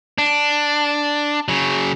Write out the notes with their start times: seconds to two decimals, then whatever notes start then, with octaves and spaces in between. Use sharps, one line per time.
0.18 D4
1.48 C#3 F#3